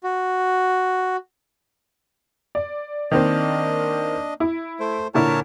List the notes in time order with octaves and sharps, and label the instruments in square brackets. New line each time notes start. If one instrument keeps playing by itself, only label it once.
[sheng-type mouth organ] F#4
[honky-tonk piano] D5
[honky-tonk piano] D#3 A#3 C4 [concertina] D4 D#5
[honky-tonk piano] E4
[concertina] A3 C5
[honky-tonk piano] A#2 D3 E4 [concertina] A#4 C#5 A5